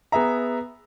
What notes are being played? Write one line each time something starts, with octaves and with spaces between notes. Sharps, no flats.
B3 G#4 E5 A#5